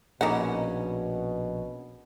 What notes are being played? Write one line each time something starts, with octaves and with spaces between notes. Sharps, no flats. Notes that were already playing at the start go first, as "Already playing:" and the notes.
A#1 B2 E3 A#3 C#4 D#4 F#5